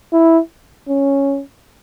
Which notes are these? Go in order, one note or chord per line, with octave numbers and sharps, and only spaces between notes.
E4
C#4